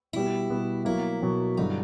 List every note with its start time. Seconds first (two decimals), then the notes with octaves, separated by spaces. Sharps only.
0.13 B2 G3 B3 E4
0.50 B2 G3 B3
0.85 B2 F#3 A#3 E4
1.21 B2 F#3 A#3
1.57 G2 D3 F#3 D#4